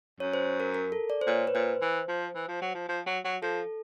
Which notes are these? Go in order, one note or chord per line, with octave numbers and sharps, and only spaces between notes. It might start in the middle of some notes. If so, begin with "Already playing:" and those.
F#2 C#5
C5
A#4
A#4
A4
D5
C5
A#2 C#5
B4
A#2 C5
E3
F3
E3
F3
F#3
F3
F3
F#3
F#3
F3 A4